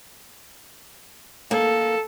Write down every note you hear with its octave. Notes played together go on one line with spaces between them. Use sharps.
A#3 A4